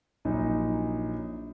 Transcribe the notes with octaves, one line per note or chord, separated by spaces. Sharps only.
A#1 F#3 D#4